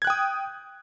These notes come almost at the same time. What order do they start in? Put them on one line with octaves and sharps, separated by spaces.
G#6 F#6 G5 D#6